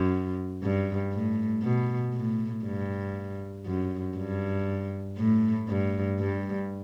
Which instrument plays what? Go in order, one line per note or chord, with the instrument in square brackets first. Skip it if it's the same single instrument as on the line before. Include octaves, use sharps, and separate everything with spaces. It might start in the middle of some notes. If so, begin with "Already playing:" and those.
Already playing: [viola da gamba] F#2
G2
A2
B2
A2
G2
F#2
G2
A2
G2
G2